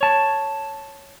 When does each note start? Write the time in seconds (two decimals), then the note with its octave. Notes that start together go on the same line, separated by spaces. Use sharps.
0.01 C#5 A5